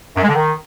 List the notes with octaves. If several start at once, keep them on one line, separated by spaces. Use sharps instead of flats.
F#2
G#3
D3
D#3